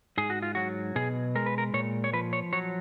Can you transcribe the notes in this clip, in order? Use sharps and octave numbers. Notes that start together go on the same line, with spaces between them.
G#2 G#4
F#4
F4
F#3 F#4
B2 G#4
G#3 A#4
B4
A#4
A#2 C#5
C#5
F3 B4
C#5
F#3 C#5